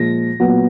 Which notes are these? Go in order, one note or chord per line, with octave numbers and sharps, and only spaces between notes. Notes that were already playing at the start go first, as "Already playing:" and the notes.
Already playing: A#2 F3 G#3 A#6
A#2 F#3 B3